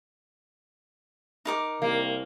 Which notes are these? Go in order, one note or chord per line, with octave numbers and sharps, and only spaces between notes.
D#4 A#4 D6
C2 A#3